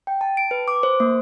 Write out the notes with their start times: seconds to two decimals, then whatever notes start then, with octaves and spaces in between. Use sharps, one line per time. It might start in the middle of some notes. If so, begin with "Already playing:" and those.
0.07 G5
0.21 A5
0.37 D7
0.51 B4
0.68 D6
0.83 C5
1.00 A#3